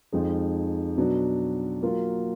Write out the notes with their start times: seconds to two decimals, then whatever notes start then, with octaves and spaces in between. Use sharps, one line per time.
0.12 F2 F3 G#3 D#4
0.98 B2 F#3 D4
1.83 F#3 A#3 F4 A#4